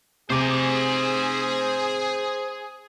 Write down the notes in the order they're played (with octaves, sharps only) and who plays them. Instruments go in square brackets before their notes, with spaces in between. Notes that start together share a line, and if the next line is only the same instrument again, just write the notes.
[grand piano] C3 D6 [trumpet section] G#4 [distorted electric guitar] C5 G#5